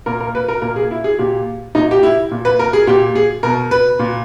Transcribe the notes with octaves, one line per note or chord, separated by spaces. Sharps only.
A#2 A#4
A#4
B4
A#4
A#2 A#4
G#4
E4
G#4
A#2 G4
A#2 D#4
G4
E4
A#2
B4
A#4
G#4
A#2 G4
G#4
B2 A#4
B4
A#2